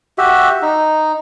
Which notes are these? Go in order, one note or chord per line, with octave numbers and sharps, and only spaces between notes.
F#4 G4 E5
D#4